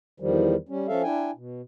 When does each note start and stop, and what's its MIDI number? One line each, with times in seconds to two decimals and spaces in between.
0.20 0.55 40
0.20 0.55 51
0.20 0.55 53
0.20 0.55 55
0.69 0.88 55
0.69 0.88 61
0.88 1.02 53
0.88 1.02 61
0.88 1.02 69
0.88 1.02 76
0.88 1.02 77
1.03 1.31 62
1.03 1.31 64
1.03 1.31 79
1.03 1.31 80
1.36 1.61 47